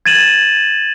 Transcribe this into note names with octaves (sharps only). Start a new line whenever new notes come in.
G#6 A6 D#7 E7 F#7